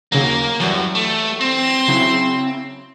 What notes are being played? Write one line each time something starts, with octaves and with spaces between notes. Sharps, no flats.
D#2 C#3 F#3 A#3
F#2 E3 F#3 G3
A3
C4 C6
C#3 F#3 E4